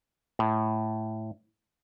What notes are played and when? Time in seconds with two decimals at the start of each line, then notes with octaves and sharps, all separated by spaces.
0.39 A2